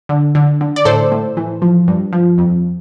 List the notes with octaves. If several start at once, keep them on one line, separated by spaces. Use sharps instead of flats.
D3
D3
D3
D5
A2 A4 C5
A2
E3
F3
G2
F3
F2